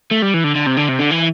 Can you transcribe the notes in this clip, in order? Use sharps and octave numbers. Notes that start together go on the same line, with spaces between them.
A3
G3
E3
D3
D3
C3
D3
C3
D3
E3